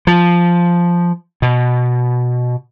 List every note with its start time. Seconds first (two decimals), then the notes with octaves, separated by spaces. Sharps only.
0.07 F3
1.42 B2